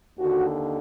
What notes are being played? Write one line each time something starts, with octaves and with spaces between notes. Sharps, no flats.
D#2 D3 F#4